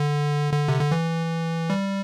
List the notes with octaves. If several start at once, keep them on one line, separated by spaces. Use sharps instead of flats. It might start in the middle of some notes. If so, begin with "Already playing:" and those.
Already playing: D3
D3
C3
D3
E3
G3